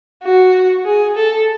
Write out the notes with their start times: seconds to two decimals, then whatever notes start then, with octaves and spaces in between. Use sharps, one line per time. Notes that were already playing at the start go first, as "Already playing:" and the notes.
0.23 F#4
0.85 G#4
1.16 A4